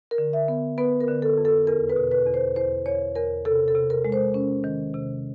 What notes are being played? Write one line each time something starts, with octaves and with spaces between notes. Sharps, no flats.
A#4
D3
E5
B3
B3 B4
A#4
D3
A4
F2
A4
E2 A#4
B4
B2
B4
E2
C5
E2 C5
E2 C#5
E2 A#4
C3 A4
A4
C3
A#4
G#3
C5
C#4
D#3
C3